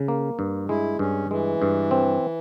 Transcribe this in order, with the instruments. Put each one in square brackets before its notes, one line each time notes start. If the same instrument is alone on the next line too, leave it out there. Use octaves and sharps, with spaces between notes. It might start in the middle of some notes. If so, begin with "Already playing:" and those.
Already playing: [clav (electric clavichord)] C#3
A#3
G2
[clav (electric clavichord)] G#3 [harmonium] E4
[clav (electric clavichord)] G2 [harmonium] C#4
[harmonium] E3 [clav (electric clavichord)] G#3
[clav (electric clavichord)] G2
C4